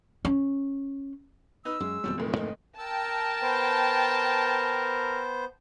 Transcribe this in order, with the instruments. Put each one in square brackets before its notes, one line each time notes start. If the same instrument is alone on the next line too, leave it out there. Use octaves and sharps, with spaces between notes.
[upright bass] C#4
[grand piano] D#4 B4 [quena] E6
[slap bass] F#2 [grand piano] G#3
[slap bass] D#1 F2 F#3 [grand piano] G#2 B2 G3
[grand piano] F1 A2 D#3
[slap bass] F2 G#2 A#3 [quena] D#5
[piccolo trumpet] A#4 [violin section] G5 A5 [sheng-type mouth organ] E6
[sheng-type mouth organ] B3 C5